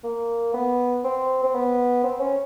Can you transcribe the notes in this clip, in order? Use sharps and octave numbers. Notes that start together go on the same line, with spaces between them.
A#3
B3
C4
C4
B3
C4
C#4